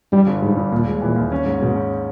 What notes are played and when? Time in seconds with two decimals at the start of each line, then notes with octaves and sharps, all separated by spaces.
0.12 G2 G3
0.27 G1
0.42 G#2 G3
0.57 G2
0.72 D#2 A#2
0.87 G#3
1.01 A#2 E3
1.16 D#2
1.32 C#4
1.46 G#2
1.61 G#2 B2
1.75 C#4